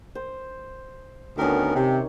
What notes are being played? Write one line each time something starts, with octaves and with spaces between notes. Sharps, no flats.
C5
D2 D#3 B3 C#4 A#4
C3